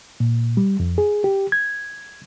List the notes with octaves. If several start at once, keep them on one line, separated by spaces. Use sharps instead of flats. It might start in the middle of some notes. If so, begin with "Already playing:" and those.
A#2
G3
F2
G#4
G4
G#6